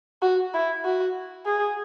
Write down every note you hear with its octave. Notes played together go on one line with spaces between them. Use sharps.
F#4
E4
F#4
G#4